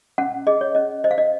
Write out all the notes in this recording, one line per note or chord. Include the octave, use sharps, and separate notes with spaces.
C#4 F#5
G#4 D#5
C#5
C#4 D#5
C5 D#5
F5
D#5